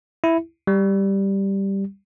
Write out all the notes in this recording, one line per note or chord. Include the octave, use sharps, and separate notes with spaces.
E4
G3